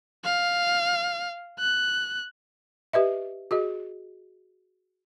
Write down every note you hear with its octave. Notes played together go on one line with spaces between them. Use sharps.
F5
F#6
G4 B4 D#5 E5
F#4 G#4 D#5